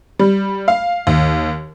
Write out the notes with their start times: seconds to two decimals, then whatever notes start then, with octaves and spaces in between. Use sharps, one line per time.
0.19 G3
0.68 F5
1.07 D#2